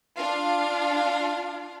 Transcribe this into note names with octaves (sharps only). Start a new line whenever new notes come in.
D4 F4 F5